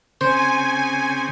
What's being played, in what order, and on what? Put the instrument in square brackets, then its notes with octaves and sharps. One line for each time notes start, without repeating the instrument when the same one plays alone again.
[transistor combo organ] C#3 C4 [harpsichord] C5 [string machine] G#5